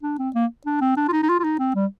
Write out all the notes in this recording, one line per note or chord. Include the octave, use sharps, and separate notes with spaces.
D4
C4
A#3
D4
C4
D4
F4
D#4
D#4
F4
F4
D#4
C4
G3